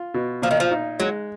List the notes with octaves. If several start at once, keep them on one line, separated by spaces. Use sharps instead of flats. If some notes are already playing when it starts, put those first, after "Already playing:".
Already playing: F4
B2
A#2 F3
D#3
F3
D#4
F#3 G#3